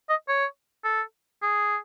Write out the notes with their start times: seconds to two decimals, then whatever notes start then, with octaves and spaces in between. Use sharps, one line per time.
0.09 D#5
0.28 C#5
0.84 A4
1.42 G#4